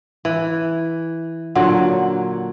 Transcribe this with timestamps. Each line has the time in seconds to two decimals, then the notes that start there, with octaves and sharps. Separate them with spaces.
0.25 E3
1.55 A#2 D3 F#3